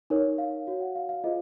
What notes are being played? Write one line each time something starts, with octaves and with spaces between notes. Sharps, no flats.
D#4 A#4 C#5
F5
F#4 C#5 F5
F#5
F5
F5
F4 G#4 C5 D#5